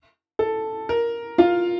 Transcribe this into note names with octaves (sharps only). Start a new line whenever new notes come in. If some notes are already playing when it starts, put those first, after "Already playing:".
A4
A#4
F4 F5